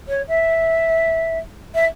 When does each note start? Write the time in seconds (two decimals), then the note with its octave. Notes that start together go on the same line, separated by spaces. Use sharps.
0.08 C#5
0.28 E5
1.75 E5